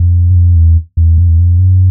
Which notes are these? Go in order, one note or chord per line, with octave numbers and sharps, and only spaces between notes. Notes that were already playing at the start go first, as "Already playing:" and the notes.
Already playing: F2
F#2
F2
E2
E2
F2
E2
F2
F#2